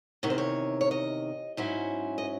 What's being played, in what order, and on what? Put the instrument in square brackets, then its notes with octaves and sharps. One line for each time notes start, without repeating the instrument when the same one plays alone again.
[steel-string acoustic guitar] E2 C3 D#3 C#5
C5
C#5
C#5
D#5
G#2 F#3 C#4 E4 C5
D#5